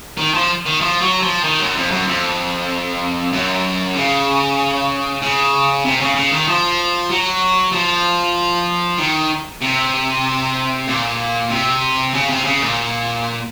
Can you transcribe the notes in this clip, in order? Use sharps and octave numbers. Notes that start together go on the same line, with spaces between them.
D#3
F3
D#3
F3
F#3
F3
D#3
F#2
F2
F#2
F2
F#2
C#3
C#3
C3
C#3
C#3
D#3
F3
F#3
F3
D#3
C3
A#2
C3
C#3
C3
C#3
A#2